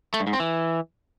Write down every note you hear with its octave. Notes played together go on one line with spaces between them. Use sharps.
A3
G2
G#2
C4
E3